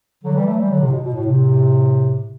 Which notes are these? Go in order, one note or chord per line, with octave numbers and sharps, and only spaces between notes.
D3 F#3
E3 G3
F#3 A3
E3 G3
D3 F#3
A2 C3
B2
B2
A2
A2 C3